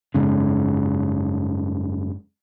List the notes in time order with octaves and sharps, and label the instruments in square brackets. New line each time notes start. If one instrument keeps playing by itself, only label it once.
[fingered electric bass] F#1 G#2 C#3